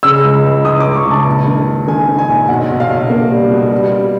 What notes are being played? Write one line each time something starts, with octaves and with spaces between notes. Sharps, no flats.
C#3 E6
C#2
C#2
C#2 D#6
C#2 D6
C#6
C#2
A5
A#1
D#3
A#1
D#3 G#5
D#3
G#5
A#1
B1 F#5
B1
F5
B1
A#3
G3
B2
G3
G3